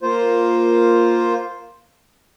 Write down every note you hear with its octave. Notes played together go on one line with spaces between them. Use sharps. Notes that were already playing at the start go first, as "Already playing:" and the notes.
A#3 F4 C5